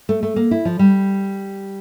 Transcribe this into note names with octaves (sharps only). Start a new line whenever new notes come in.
A3
A3
A#3
E4
F3
G3